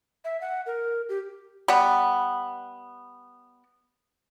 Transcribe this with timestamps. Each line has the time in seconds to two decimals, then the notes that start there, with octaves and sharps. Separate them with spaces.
0.25 E5
0.41 F#5
0.66 A#4
1.09 G4
1.68 G3 B3